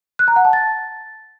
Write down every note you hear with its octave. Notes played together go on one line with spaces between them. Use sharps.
F#6
A#5
F#5
A5
A6